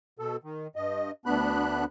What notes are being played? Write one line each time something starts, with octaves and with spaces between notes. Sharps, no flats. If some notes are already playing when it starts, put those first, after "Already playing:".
B2 A4
D#3
G2 D#5
D2 B3 D4 B5 F#6